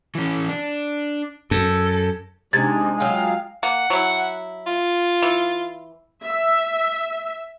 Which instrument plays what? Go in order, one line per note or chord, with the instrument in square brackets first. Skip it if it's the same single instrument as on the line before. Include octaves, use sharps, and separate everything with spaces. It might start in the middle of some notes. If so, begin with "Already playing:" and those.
[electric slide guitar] E3 C#4
D4
[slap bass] F#2 [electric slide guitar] A4
[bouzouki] C3 [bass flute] G#3 [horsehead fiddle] D4 D#4 [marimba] G#6 A6
[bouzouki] F#3 F4 G5 [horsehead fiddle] F5
[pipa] A#3 [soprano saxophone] F#5
[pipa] F#3 E4
[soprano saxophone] F4
[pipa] E3
[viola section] E5